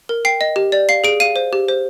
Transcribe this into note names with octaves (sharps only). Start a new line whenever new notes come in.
A#4
G5 C7
D#5
G4
D5
F5 C7
G#4 D7
F5 D#7
C5
G4
C5